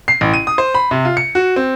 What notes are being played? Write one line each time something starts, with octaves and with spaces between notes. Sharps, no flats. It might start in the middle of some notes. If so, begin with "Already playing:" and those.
C7
A1
D#7
D#6
C5
B5
C3
F4
C#7
F#4
C4